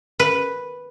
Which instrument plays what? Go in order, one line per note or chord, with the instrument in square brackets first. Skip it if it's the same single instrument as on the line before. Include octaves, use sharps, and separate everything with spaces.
[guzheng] B4